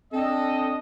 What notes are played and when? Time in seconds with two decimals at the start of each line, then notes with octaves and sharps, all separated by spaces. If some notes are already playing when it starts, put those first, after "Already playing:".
0.13 C4 D4 A4 D#5